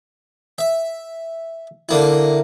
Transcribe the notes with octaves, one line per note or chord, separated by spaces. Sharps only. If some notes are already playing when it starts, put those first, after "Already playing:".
E5
D3 A#3 E4